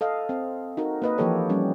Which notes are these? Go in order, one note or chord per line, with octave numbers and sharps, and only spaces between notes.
A4 D#5 F5
C4
D#4 F#4 A#4
A#3 B4 D#5
E3 F3 A#3 G4 A4 C#5
G3 C#4